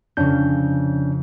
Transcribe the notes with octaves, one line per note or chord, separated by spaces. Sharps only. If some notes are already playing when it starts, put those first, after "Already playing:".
F2 C#3 C#4 D4 G6